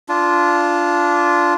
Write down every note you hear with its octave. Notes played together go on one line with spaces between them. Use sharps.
D4 F4